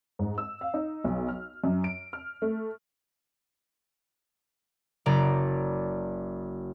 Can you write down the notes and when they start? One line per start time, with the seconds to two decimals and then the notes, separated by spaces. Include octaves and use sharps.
0.19 G#2
0.38 E6
0.61 F5
0.74 D#4
1.04 B1
1.28 F6
1.64 F#2
1.84 D7
2.13 F6
2.42 A3
5.06 F#1 D5 A#5